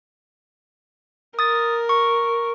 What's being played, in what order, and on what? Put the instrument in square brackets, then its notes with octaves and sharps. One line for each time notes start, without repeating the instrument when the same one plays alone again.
[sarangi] A#4 [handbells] D#6 A6
[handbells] C#6